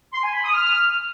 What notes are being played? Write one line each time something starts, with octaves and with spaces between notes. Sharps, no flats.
C6
G#5
B5
D#6
F6